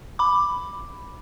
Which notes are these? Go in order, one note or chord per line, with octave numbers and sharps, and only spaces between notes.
B5 D6